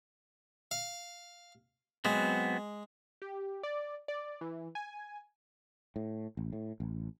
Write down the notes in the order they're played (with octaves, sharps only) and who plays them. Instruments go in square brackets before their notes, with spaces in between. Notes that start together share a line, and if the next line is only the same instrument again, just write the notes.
[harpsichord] F5
[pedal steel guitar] F#3 B3 C4 [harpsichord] G#3
[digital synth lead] G4
D5
D5
E3
G#5
[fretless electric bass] A2
A1
A2
A1